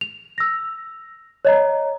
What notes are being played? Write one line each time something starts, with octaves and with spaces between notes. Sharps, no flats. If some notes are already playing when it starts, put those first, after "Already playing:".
F7
E6 A#6
C#5 D#5 A#5